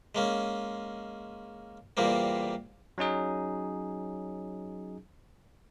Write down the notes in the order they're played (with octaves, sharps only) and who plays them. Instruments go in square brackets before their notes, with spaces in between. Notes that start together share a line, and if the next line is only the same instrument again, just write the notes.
[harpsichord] G#3 A#3 C#4
E2 A#2 G3 A#3 C4
[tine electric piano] F#3 C#4 D#4 G#4